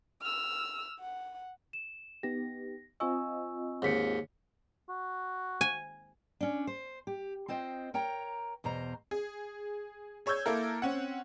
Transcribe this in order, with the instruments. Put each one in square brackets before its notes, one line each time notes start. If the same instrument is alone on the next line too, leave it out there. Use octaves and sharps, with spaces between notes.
[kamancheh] E6 F6
F#5
[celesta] E7
[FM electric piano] B3 D#4 G4 [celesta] A#6
[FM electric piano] C4 F4 D#5 [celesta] G#5 C#6 E6
[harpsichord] D#2 G#2 [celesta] C#5 B6 C#7
[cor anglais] F#4
[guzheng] G#5
[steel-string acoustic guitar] C#4 D4
C5
G4
C4 F4 C5 D#5 G5
A#4 C#5 G5 A#5
E2 B2 C5 A#5
[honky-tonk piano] G#4
G#4 C#5 C#6 E6 G6 G#6
A#3 E4 A4 A#4
C4 C#4 F#5